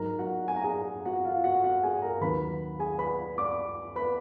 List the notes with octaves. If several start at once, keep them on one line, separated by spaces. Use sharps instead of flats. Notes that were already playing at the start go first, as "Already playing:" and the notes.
Already playing: G#2 F#3 A#4 A#5
F#4 F#5
G#5
A#5
G#4 G#5
F#4 F#5
F4 F5
F#4 F#5
F#4 F#5
G#4 G#5
A#4 A#5
D#2 D#3 F#3 B4 B5
G#4 G#5
B4 B5
D5 D6
B4 B5